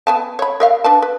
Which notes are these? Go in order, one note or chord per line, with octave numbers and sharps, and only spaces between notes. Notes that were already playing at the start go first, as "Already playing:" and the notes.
B3 G#5 A5
C#5 B5
A#4 E5 F5
D4 B4 A5
B4